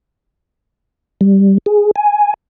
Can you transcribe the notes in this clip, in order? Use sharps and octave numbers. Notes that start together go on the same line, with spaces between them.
G3
G#4
G#5